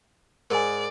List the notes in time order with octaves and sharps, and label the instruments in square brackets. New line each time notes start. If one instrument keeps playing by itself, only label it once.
[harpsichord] G#2 [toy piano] A#4 G#5 [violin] D5